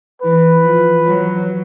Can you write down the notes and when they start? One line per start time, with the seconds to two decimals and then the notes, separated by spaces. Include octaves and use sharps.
0.22 E3 B4
0.63 F3
1.04 F#3